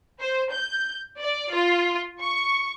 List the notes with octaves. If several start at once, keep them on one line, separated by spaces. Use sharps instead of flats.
C5
G6
D5
F4
C#6